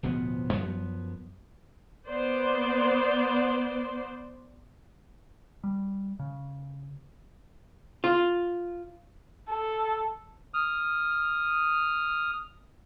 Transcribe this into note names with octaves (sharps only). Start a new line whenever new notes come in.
D1 B2 F3 B3
F#2 F3 B3
B3 C5 D5
G3
C#3
F4
A4
D#6 F6